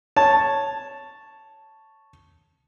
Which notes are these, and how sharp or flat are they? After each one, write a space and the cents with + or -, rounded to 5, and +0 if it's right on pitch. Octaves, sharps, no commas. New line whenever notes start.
C#5 +0 A5 +0